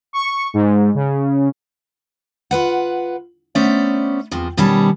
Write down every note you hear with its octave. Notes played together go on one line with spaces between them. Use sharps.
C#6
G#2
C#3
F4 B4 F#5
A3 B3 C#4 C5 D5 E5
E2 F3 C4
B2 D#3 G3 C#4 C#5 A5